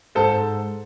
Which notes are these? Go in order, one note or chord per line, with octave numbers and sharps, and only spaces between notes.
G#2 A4 C5